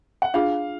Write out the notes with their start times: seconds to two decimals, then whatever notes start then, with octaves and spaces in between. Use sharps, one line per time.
0.22 F#5
0.34 D4 F4 G#4 F5